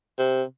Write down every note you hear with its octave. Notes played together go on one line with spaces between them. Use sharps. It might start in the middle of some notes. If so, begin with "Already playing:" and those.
C3